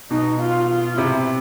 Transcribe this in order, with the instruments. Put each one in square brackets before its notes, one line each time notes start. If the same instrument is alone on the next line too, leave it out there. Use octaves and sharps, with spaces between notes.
[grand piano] B2 [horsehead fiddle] D#4
[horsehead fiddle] F4
F4
[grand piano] C3 [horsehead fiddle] E4